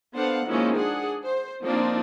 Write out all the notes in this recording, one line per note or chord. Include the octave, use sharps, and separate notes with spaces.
B3 D4 A4 C5 F5 F#5
D#3 F3 G#3 A#3 C#4 E4
D4 G#4 F#5
C5
F3 A#3 C4 D4 D#4